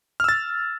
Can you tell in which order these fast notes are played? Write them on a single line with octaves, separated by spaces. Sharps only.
F6 E6 A6